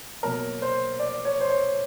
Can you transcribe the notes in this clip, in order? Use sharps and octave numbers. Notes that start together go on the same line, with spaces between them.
B2 F#3 A#3 A#4
C5
D5
C#5
C5
C#5